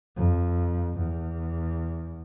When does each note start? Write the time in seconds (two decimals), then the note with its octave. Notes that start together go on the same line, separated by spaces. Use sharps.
0.17 F2
0.99 E2